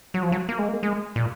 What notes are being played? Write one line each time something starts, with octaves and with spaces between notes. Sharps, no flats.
F#3
F3
F#3
A#3
G#3
A#3
G#3
A#2